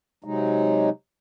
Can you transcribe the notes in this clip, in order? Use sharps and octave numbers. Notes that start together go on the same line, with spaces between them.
C3 F#3 G#3 D#4